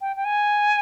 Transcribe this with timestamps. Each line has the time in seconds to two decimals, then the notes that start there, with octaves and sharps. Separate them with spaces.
0.01 G5
0.16 G5
0.25 G#5